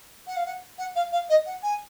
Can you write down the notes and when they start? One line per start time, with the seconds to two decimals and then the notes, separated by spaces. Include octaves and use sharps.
0.27 F#5
0.36 F5
0.46 F#5
0.78 F#5
0.96 F5
1.12 F5
1.29 D#5
1.46 F#5
1.63 G#5